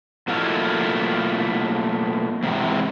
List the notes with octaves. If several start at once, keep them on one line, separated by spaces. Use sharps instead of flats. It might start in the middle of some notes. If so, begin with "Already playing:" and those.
B2 F#3 A3 A#3 E4 F4
E2 G#2 C3